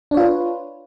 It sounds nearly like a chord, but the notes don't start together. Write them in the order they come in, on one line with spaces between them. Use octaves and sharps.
D4 C#5 F4 B4